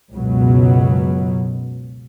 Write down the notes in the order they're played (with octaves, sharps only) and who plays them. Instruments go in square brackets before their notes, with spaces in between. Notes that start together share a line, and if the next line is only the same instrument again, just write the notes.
[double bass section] C#2 F#2 B2 F#3